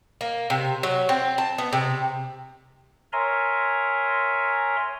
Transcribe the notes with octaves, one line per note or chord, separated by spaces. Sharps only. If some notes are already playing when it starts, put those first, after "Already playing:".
A#3
C3
F#3
C4
A5
B3
C3
A#4 C#5 E5 G#5 A#5 C6